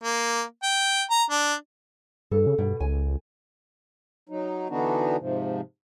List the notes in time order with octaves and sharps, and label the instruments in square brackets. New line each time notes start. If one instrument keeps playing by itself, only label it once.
[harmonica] A#3
G5
A#5
D4
[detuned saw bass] G2 [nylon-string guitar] A4
[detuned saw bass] C#3
[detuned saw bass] G2 [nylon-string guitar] B2
[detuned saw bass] C#2 [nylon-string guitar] G#5
[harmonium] F#3 D#4
D3 E3 B3 D4 D#4 F#4
G#2 C3 F3